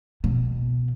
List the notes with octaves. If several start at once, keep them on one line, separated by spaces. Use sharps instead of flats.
B2